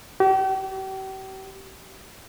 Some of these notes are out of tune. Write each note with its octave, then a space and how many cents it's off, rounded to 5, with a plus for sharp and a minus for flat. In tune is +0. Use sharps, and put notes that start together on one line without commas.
G4 -40